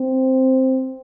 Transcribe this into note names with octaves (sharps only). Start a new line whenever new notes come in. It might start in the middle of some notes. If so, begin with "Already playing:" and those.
Already playing: C4